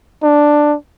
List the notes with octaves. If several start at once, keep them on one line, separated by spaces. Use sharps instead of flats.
D4